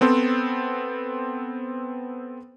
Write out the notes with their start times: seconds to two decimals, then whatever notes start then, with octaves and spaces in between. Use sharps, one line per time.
0.01 B3 C4 A4 C5